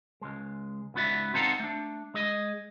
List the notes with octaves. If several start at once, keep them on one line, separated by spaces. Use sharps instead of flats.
C#2 G#3
C#2 G#2 B3 F#4 D5 E5
C4 D#4 F4 A4 F#5 A#5
A3 D4
G#3 G#4 D#5